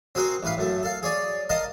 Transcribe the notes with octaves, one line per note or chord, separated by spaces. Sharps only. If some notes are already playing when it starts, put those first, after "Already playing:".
C4 F#4 G#4 A#4 C5
A1 B4 F5
F#2 A3
A4 F5
G#4 C#5 D5
A#4 D#5 F5 A5